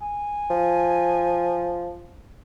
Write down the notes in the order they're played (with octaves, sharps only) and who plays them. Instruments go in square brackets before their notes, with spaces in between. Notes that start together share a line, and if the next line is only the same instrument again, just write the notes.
[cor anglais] G#5
[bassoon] F3